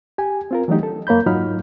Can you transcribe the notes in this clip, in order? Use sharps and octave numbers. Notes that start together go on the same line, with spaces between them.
G4 G#5
C4 F4 A#4
E3 F#3 A3 D4 D#4 G4
A4
F#2 A#3 C#5 B5 G6
G#2 F#3 D#4 F4 B5 F6